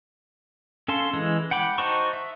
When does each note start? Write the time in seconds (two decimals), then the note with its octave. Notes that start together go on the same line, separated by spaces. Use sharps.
0.88 C#4 A4 F5 A5 C6
1.13 E3 G#3
1.51 F#5 G5 B5 D6
1.78 D#4 F#4 C5 A5 C#6
2.13 E5